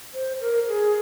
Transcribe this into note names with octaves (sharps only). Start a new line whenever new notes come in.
C5
A#4
G#4